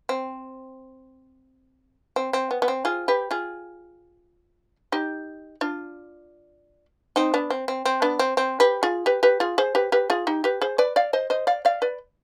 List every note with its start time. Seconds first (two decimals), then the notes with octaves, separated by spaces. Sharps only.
0.09 C4
2.16 C4
2.33 C4
2.51 B3
2.62 B3
2.68 C4
2.85 F4 G#4
3.08 G4 B4
3.31 F4 G#4
4.92 D#4 G4
5.61 D4 F4
7.16 C4 D#4
7.34 B3 D4
7.50 C4
7.68 C4
7.85 C4
8.02 B3 D4
8.19 C4
8.37 C4
8.60 G4 B4
8.83 F4 G#4
9.06 G4 B4
9.23 G4 B4
9.40 F4 G#4
9.58 G#4 C5
9.75 G4 B4
9.92 G4 B4
10.10 F4 G#4
10.27 D#4 G4
10.44 G4 B4
10.61 G#4 C5
10.78 B4 D5
10.96 D5 F5
11.13 C5 D#5
11.30 C5 D#5
11.47 D5 F5
11.65 D5 F5
11.82 B4 D5